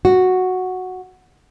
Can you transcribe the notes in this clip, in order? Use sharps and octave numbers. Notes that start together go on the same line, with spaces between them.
F#4